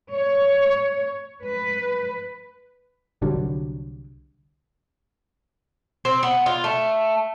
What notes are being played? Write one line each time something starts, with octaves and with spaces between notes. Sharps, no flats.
C#5
B4
C2 D3 F#3 G3
C4
B3
F4
A3